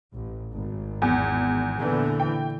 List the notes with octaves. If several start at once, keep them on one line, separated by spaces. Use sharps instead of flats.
A1
G#1
E2
A#2 D3 E3
G5